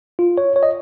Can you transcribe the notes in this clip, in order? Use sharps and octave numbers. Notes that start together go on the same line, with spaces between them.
F4
C#5
C#5
D#5